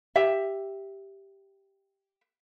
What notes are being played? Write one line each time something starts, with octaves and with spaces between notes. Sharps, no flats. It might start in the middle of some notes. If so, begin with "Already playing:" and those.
G4 E5